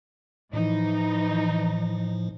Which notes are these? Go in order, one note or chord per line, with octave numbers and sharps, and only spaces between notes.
A2 E3 F3 D#4